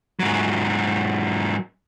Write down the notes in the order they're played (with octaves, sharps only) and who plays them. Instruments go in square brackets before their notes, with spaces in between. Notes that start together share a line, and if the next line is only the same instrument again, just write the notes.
[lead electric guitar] G#2 F#3